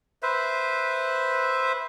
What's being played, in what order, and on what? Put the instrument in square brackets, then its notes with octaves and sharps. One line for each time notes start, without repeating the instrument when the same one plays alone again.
[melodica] B4 C5 E5